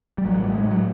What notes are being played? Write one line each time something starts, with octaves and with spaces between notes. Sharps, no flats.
G3
A1 F#3
G3
A2
G#3
A2
F#3